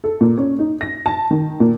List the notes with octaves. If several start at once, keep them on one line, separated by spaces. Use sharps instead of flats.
A4
A#2
C#4
D#4
A#6
A5
D#3
A#2